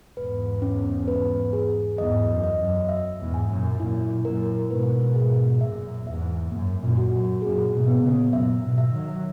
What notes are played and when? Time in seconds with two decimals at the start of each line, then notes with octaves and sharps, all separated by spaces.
0.17 E2 G#2 B4
0.62 C#4
1.08 B4
1.53 G#4
1.98 E2 G#2 D#5
2.28 F#2
2.44 D#5
2.59 F#2
2.89 E5
3.19 E2 G#2
3.34 G#5
3.49 F#2 A#2
3.79 F#2 A#2 E4
4.24 F#2 A#2 A#4
4.70 G#2 B2 B4
5.16 G#4
5.61 F#2 A#2 E5
6.07 E2 G#2 E5
6.51 F#2 A#3
6.82 F#2 A#2
6.97 F#4
7.12 F#2
7.42 F#2 A#2 G#4
7.72 G#2 B2
7.87 B3
8.03 A#2 C#3
8.33 F#2 A#2 E5
8.63 G#2 B2
8.78 E5
8.93 D#3 F#3